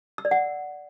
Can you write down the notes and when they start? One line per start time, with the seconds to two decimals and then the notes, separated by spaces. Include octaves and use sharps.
0.18 E6
0.25 D5
0.31 F#5